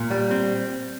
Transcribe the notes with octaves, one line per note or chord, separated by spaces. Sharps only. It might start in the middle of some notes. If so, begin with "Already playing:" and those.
Already playing: A#2
G3
C4